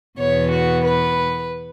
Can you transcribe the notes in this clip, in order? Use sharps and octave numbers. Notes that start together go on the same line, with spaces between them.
E2 B2 B3 C#5
F#4
B4